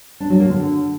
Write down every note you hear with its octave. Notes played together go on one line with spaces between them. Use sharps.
D4
F#3
A#3
D3